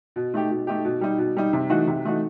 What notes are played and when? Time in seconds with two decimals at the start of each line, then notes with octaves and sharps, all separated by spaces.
0.16 B2
0.34 A3 D#4 G4
0.50 B2
0.67 A3 D#4 G4
0.85 B2
1.01 G3 D#4
1.18 B2
1.36 G3 D#4
1.53 C3
1.70 E3 A3 D#4 F#4
1.87 C3
2.05 E3 A3 D#4 F#4